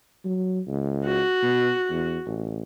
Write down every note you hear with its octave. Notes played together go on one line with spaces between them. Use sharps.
F#3
C#2
F#4
B2
E2
A1